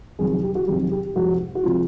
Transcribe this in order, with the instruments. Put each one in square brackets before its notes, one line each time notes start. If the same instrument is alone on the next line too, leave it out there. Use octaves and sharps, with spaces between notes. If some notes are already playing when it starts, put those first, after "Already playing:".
[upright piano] F2 C3 D#3 F#3 G#4
G#4
G4
F#4
F2 C3 D#3 F#3 G4
G4
F2 C3 F3 G#3 F#4
F#4
C3 F3 G#3 F4